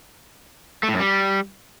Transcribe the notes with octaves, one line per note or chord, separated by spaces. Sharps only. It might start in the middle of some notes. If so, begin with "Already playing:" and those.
A3
A2
F#2
G3